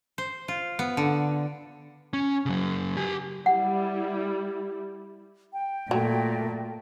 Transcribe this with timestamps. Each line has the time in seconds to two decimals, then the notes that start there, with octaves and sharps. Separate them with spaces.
0.18 C5
0.48 F4
0.79 B3
0.97 D3
2.13 C#4
2.46 C#3 F#3
2.97 G4 G#5
3.46 G3 E4 F#5
5.53 G5
5.91 A#2 F#3 A3